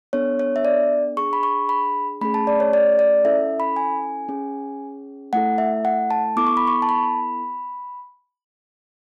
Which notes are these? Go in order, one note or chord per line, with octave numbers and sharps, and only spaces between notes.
B3 D4 A4 C#5
C#5
E5
D5
D4 G#4 C#6
B5
C#6
B5
A3 C#4 G#4 B5
A5
D5
C#5
D5
D5
C#4 E4 A4 E5
B5
G#5
C#4 G#4
A3 E4 A4 F#5
E5
F#5
A5
B3 E4 A4 D6
C#6
B5
C#6
A5
B5